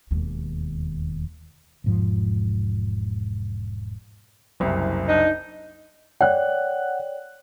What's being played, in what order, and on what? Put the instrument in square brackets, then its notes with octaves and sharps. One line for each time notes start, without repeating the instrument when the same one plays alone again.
[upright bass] E1 D#2
[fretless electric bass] E1 G#2 F3
[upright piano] F#1 C2
[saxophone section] D4 D#4
[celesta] C#5 D5 G5 [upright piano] F#5 F#6